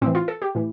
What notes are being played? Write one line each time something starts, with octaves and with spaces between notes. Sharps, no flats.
A2 E3 C4
F4
A4
G4
A2 E3